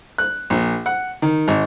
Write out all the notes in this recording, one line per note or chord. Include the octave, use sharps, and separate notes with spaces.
F#6
A#1
F#5
D#3
G#1